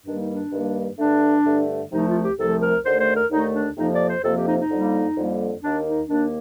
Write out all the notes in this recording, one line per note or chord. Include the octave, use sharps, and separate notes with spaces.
G2 D#3 G3 A#3 D4
D#4
D4
G2 D#3 G3 A#3
G2 D3 A3 D4
G2 D3 A3
C2 C3 F3 A3 D#4
F4
G4
C2 C3 F3 A3 A4
A#4
D#2 D3 A3 C5
C5
A#4
D#2 D3 A3 D#4
D4
F2 C3 F3 A#3 D#4
D5
C5
F2 C3 F3 A#3 A4
G4
D#4
D#4
F2 D3 G3 A#3
F2 D3 G3 A#3
D#2 D#3 A#3 D4
D#4
D#2 D#3 A#3 D4